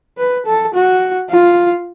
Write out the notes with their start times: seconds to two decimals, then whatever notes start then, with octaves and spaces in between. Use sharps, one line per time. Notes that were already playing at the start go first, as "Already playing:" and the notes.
0.18 B4
0.46 A4
0.75 F#4
1.30 F4